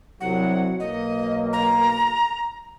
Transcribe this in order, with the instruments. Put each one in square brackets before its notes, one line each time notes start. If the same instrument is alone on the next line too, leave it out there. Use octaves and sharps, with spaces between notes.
[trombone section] C2 F#3 [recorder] F#5
[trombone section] B1 A#3 [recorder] D#5
[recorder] A#5